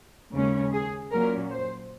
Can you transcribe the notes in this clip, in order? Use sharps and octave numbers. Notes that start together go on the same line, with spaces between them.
D#2 C#3 G#3 C#4
G#4
A#2 F#3 C#4 A#4
C5